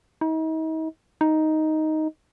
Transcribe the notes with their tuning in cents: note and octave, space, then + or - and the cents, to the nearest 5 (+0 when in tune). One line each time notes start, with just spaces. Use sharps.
D#4 +40
D#4 +5